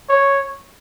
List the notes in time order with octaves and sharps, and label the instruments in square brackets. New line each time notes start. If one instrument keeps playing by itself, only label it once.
[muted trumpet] C#5